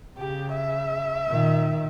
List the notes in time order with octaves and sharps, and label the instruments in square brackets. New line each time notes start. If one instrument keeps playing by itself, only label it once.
[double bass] C#3 [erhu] G4
[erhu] E5
[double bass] A#2 D#3